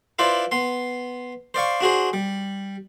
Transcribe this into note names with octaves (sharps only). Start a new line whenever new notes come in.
E4 F4 B4 C5 D5
B3 C6
C5 D5 F5 C#6
D4 F#4 G#4 C5
G3